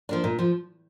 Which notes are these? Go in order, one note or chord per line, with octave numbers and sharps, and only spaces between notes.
F3 A#3 D4
A#2
F3